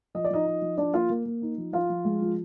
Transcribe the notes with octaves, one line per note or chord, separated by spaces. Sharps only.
F3 D#5
D5
F3 D#4 D#5
D#4
F3
F3 D4 D5
A#3 F4 F5
A#3
A#3
D#4
F3
F3 F4 F5
F3
G#3
F3